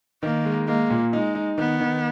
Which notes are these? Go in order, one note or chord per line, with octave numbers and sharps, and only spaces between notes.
D#3 A#3
G#3
G#3 A#3
A#2
G#3 D#4
D#4
D#3 B3
D#3